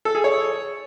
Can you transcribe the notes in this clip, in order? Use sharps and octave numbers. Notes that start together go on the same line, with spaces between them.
A4
G#4
C#5